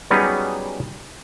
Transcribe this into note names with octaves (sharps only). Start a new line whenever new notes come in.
F#3 G3 B3 C#4 D#4 G#4